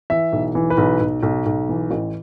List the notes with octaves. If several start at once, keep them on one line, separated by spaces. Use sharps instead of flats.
E3 E5
B1
E3
B4
B1
B1
B1
B1
E3
A1